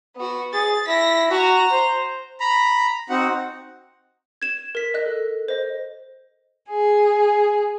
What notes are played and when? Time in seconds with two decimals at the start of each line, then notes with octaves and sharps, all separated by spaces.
0.16 B3 F#4
0.53 G#4 A6
0.87 E4 A#6 B6
1.31 F#4 A#5
1.71 C5
2.40 A#5 B5
3.10 C4 D#4 F#4 F#5
4.42 G#6 E7
4.75 A#4 B6
4.94 D#5 F#6
5.06 A4
5.48 C5 D#5
6.70 G#4